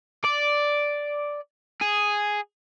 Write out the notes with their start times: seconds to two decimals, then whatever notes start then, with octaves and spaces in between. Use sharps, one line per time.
0.24 D5
1.81 G#4